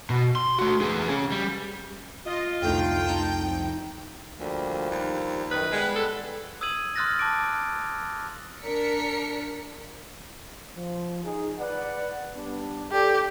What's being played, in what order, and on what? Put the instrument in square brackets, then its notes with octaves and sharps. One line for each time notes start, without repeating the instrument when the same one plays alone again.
[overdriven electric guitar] B2
C6
A3 F#4
B3 G#4
C#4 G#4
G3
[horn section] F4 [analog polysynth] D#5
[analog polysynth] C2 F2 [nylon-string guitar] D3 A3 D#4 [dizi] G5
[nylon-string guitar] D#4 A5
[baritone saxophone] D2 [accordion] F3 G3 A#3
[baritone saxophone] D#2
[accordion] F#2 D#3 D#6 [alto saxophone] B4
[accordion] G3 B3 [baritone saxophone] G#3
[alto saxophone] A4
[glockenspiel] D#6 E6 G#6 D#7 F#7
C6 D#6 F6 F#6 A6 A#6
A5 D6 D7
[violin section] D4 A#4 B6 C#7
[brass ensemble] F3
D#4 G#4
B4 D5 F#5
G3 B3 D4
[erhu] G4 [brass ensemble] A4 D5 G5